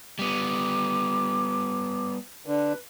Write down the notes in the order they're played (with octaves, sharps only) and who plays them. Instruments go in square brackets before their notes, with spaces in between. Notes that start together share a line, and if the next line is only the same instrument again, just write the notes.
[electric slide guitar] G3 B3 [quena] D6
[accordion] D3 [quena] B4